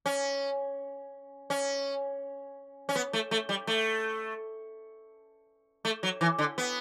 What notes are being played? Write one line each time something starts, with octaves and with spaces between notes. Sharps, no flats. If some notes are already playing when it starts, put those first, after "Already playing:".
C#4
C#4
C#4
B3
A3
A3
G3
A3
A3
F#3
E3
D3
B3